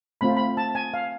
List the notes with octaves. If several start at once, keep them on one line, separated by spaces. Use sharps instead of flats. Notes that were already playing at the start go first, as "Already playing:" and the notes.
A3 C4 F4 B5
B5
A5
G#5
F5